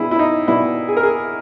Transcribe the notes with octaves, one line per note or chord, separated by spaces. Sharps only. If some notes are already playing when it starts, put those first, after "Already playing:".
Already playing: B2 G3 B3 E4 G#4
E4
D#4
B2 G3 B3 E4
G#4
A#4
G#4